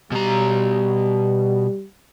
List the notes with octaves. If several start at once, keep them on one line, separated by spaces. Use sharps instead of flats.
B2 G3 A#5